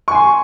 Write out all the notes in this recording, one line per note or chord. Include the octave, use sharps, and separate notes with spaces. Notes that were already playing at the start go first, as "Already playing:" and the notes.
G#5 C6 C#6